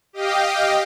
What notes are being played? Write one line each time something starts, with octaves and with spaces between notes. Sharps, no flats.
G4 D#5 F5 G5